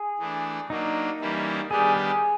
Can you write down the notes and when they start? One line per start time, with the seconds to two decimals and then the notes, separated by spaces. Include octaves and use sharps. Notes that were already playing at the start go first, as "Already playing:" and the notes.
Already playing: G#4
0.19 E3 A3 D4
0.69 F#3 A#3 D4 D#4
1.20 E3 G3 A#3 C#4 E4
1.71 D#3 G3 B3 D4 G4 G#4
1.96 G#4